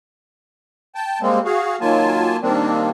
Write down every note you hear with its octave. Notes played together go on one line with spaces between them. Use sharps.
G5 A5
G3 G#3 A#3 C4
F#4 G#4 F5
D#3 F#3 A#3 F4 G#5 A5
D#3 G3 A#3 C4 D4